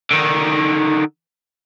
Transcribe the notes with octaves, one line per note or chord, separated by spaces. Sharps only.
D3 D#3